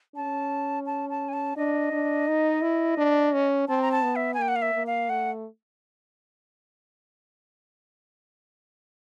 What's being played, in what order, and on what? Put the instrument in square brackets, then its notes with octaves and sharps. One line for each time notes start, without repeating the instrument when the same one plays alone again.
[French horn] C#4 [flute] A5
[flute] A5
A5
G#5
A5
[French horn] D4 [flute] D#5
[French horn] D4
D#4
E4
D4
C#4
[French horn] C4 [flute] A5
[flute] A#5
A5
[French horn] B3
[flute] E5
G#5
[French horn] A#3 [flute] G5
[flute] F#5
F5
E5
[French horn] A#3
[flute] F5
[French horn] A3 [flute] F#5